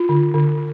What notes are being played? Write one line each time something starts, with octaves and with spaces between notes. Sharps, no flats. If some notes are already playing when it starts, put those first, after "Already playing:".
Already playing: F4
D3
D3